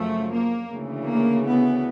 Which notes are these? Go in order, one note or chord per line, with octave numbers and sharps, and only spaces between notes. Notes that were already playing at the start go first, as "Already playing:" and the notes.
Already playing: F#2 C#3 F3 A3
A#3
D2 C#3 E3
A#3
B3